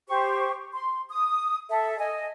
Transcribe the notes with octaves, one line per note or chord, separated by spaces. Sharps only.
G4 C5 C#6
C6
D#6
A4 E5
D#5 G#5